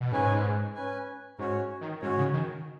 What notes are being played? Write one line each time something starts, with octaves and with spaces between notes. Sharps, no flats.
B2
G#2 C#4 B4 G#5
C#4 B4 G#5
G#2 C#4 F#4 C#5
D#3
G#2 C#4 F#4 C#5
C#3
D#3